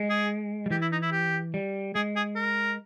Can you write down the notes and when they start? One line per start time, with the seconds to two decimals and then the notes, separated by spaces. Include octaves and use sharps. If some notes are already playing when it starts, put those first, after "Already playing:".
Already playing: G#3
0.10 G#4
0.66 G3
0.71 E3 G4
0.82 E4
0.92 D#4
1.02 E4
1.12 G4
1.54 G3
1.95 G#3 G#4
2.16 G#4
2.36 A#4